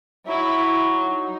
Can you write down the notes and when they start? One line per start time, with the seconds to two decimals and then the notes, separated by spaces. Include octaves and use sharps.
0.27 F#3 E4
0.98 D#4